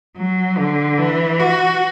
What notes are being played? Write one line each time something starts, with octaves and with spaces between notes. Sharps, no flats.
F#3
D3
E3
F#4